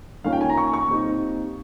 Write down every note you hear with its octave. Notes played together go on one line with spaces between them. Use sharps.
D#3 A#3 C#4 F4 F5
G5
G#5
A#5
C#6
C#6
A#2 G3 C4 D#4